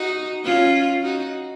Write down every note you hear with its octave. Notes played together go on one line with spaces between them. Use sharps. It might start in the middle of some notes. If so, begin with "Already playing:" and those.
Already playing: D#4 F#4
C#4 F4
D#4 F#4